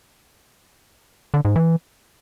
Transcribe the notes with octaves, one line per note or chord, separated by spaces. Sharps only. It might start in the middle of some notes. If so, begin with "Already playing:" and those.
D3
G#2
E3